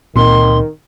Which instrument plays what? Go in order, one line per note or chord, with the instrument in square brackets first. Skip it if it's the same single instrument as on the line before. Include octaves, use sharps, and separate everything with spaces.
[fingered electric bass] C#2 A#2 C4 [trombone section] D#3 [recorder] C6